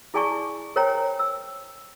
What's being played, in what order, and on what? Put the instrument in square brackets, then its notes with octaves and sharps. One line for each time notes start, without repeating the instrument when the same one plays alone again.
[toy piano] E4 G#4 D5 G#5 A5 C#6
A#4 C5 C#5 G5 G#5 A#5
E6